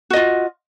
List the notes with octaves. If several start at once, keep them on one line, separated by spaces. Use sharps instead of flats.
F4 F#4 D#5